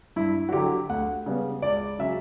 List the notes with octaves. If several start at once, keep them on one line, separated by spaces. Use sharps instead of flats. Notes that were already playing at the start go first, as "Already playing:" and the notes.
G2 E4
F#4
D3 F#3 G4
D2 F#5
C#3 G3 B3
C#2 D5
C#3 F#3 C#4 E5